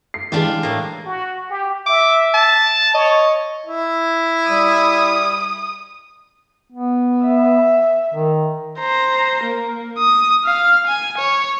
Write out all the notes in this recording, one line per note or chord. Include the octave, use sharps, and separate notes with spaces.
C7
E3 G#3 D4 F4 G4
A2 A#3
F#4
G4
E5 D6
A5
C#5 D#5
E4
G3 D#6
B3
E5
D#3
C5 A#5
A#3
D#6
F5 F6
G#5
C#5